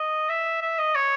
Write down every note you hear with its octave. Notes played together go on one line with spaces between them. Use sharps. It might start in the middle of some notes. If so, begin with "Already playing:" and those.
Already playing: D#5
E5
E5
D#5
C#5